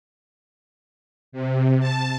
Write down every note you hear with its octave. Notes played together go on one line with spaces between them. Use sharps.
C3
A5